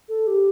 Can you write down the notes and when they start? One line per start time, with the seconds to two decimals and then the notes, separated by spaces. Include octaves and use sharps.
0.09 A4
0.27 G4